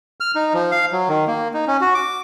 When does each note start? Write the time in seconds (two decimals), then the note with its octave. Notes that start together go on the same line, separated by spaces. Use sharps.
0.20 F6
0.35 D#4
0.54 F3
0.71 F5
0.92 F#3
1.09 D#3
1.27 A#3
1.54 D#4
1.67 C#4
1.81 F#4
1.94 D6